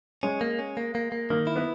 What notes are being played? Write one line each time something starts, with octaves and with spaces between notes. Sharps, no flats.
G#3 C#4 G#4
A#3
C#4
A#3
A#3
A#3
D#3 A#3 A#4
E4
B3 B4